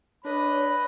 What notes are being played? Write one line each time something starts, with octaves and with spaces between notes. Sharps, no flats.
D4 B4 C#5 D#5 B5